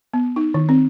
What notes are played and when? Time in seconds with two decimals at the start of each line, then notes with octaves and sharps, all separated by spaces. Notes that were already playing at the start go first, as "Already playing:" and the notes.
0.14 B3
0.36 D#4
0.54 D#3
0.69 C4